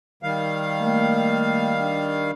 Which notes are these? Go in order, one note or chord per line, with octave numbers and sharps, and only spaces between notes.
D#3 G3 F5
A3 A#3 A#4
D4